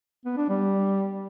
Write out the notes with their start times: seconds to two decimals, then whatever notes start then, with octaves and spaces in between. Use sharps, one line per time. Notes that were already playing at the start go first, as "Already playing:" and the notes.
0.25 B3
0.37 D4
0.49 G3